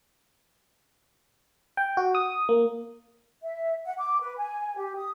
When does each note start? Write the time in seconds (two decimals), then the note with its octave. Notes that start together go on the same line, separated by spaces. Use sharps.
1.77 G5
1.97 F#4
2.15 D#6
2.49 A#3
3.42 E5
3.85 F#5
3.98 D6
4.21 B4
4.38 G#5
4.77 G4
4.95 D#6